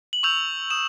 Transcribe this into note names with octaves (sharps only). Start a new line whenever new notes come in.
F#7
C#6 E6 G6 F7
D#6 E7